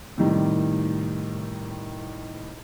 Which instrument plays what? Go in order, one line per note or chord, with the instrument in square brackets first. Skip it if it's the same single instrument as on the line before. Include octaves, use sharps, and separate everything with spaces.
[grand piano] A2 C3 D#3 G3